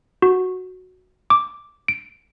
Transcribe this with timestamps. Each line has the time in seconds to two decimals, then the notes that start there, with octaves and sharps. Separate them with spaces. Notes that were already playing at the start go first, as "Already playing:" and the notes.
0.22 F#4
1.30 D6
1.88 D7